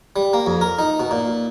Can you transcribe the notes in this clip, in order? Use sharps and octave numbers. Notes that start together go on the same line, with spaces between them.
G3
A#3
F2
A#4
D#4
B2
A#2